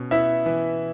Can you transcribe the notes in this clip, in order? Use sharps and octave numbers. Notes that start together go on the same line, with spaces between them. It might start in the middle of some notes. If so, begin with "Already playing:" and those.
Already playing: B2 C#4
B3 E4 E5
E3